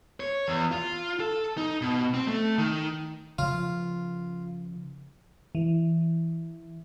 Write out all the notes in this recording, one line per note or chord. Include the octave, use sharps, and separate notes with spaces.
C#5
E2
F4
A4
D#4
B2
C4
A3
D#3
C#3 F3 F4
E3